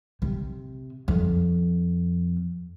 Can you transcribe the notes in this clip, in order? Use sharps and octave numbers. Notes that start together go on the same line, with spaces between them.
C3
F2